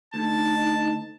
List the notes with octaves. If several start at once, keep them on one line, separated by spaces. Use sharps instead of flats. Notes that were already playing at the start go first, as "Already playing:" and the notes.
D2 D#4 A5